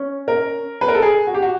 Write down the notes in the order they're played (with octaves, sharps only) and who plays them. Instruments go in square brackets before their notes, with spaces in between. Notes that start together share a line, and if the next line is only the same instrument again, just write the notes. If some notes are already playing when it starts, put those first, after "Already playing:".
Already playing: [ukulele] C#4
[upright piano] A#4
B4
A#4
A4
G#4
F#4
G4
F#4